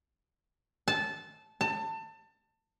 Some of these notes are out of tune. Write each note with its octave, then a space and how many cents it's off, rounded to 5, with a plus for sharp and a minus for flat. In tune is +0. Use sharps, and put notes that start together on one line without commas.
A5 -15
A5 +25